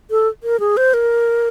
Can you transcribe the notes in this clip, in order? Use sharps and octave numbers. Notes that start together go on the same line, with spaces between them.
A4
A#4
G#4
C5
A#4